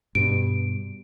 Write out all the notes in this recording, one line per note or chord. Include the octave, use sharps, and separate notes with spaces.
G2 B2 D7